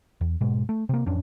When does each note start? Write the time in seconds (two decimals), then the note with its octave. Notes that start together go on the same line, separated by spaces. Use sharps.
0.21 E2
0.41 G#2 B2 G#3
0.69 A3
0.89 C3 A#3
1.06 A1 F2 C#4 D4